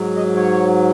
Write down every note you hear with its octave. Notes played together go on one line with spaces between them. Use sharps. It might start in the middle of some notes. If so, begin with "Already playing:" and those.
Already playing: G#2 F#3
D#5
C#5